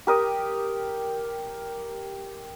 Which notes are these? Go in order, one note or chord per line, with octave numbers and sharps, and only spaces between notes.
G4 A#4 D#6